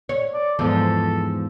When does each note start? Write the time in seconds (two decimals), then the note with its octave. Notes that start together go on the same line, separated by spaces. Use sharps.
0.09 C#5
0.34 D5
0.59 E2 G#2 F3 A4